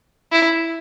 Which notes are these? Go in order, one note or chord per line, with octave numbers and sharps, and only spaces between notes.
E4